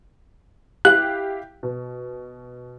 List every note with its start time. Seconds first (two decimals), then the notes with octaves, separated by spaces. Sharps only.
0.85 E4 G4 F5 F#6
1.63 B2